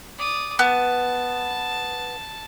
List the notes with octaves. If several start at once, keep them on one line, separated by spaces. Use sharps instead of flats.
D5 D#6
B3 A5